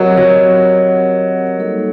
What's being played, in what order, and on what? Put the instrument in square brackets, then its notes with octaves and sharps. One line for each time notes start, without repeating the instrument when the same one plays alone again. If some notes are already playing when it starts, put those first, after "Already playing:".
Already playing: [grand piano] F#3 [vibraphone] C4 G4 A#4 D#5 F#5
[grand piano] F#3
[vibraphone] G3 A#3 D#4 A4